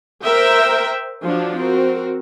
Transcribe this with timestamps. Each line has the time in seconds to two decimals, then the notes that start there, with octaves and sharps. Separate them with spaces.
0.25 A#4 C5 E5 G5
1.24 F3 F#3 D4
1.57 C4 F#4 A#4